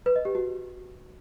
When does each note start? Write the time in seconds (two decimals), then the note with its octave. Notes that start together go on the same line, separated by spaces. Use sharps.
0.06 B4
0.16 D#5
0.25 G4
0.35 F#4